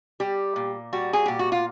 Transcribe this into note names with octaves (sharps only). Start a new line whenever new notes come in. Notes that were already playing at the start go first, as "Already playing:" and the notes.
G3 G4
A#2
G3 F#4
G#4
A#2 G4
F#4
F4